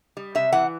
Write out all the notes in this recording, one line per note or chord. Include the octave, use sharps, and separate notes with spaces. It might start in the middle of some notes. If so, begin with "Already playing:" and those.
G3
C3 E5
E3 F#5